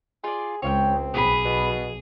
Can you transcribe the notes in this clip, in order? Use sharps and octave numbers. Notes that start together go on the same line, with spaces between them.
F4 G#4 D5
C#2 C4 C#5 F5 G5
B1 B3 G#4 B5
B2